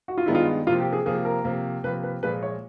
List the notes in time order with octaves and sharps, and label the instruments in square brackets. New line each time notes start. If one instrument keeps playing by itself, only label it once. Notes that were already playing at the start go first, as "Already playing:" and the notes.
[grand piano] F#4
F4
[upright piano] G2 D#3 G#3 B3 D#4 [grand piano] E4
[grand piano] F4
[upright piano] C3 F3 A#3 [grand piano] F4
[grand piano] G4
G#4
[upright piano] C3 F3 A#3 [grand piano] G#4
[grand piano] A#4
[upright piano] C3 F3 A#3
[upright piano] C3 F3 A#3 [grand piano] B4
[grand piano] B4
[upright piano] A#2 F3 G#3 [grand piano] B4
[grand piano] C#5